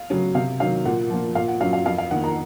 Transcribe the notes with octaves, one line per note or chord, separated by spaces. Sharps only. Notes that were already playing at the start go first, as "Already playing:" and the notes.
Already playing: F5
C#3 F#3 C#4
C3 F5
D#3 F#3 F5
A#2 F#5
F3 A#3
A#2 F5
F#5
F#3 C#4 F5
F5
F2 F5
F5
D#3 A#3 F#5
A#5